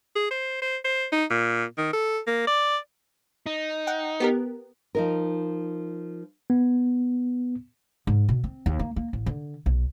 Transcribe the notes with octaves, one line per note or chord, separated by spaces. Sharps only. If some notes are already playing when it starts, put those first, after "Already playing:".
G#4
C5
C5
C5
D#4
A#2
D#3
A4
A#3
D5
D#4
F#5 G5
B3 G4 A#4
F3 D#4 A#4
B3
G#2
B2
C4
D#2
A#3
A#3
A1
D3
B1